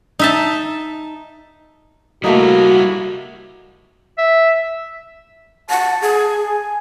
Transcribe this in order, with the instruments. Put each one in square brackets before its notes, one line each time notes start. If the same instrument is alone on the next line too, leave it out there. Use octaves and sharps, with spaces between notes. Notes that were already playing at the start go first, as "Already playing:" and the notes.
[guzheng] D#4 E5 A5
[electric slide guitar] G3 E4 [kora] A3 A#3 D#4 [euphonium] F#4
[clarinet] E5
[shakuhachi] F#5 [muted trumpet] A5
[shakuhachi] G#4
[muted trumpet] G#5